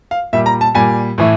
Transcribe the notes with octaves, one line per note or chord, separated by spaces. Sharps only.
F5
A#2 G3 E5
A#5
A5
A#2 G3 G#5
A2 E3 A3